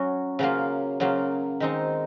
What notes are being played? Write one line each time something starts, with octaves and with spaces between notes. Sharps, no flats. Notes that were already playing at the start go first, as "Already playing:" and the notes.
Already playing: F#3 C#4 F#4
C#3 F#3 A#3 F4
C#3 F#3 A#3 F4
D#3 G#3 C4 D#4